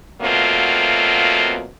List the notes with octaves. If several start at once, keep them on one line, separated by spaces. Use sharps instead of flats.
B2 F#3 A3 A#3 C4 F4